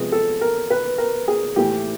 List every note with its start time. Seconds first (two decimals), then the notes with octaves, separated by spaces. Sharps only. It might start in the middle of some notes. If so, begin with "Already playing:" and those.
Already playing: C3 F3 G#3 B3 G#4
0.12 A4
0.41 A#4
0.70 B4
0.98 A#4
1.28 G#4
1.56 A2 E3 A3 G4